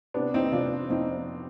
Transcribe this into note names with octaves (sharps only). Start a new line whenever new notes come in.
C3 B3 D4
C4 D#4
F1 D4 F4
F2 C4 D#4